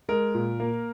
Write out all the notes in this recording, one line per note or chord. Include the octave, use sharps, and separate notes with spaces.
G#3 A#4
A#2
A#3